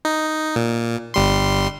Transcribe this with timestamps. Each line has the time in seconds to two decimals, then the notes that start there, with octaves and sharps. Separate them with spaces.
0.05 D#4
0.56 A#2
1.14 G1 G3 C6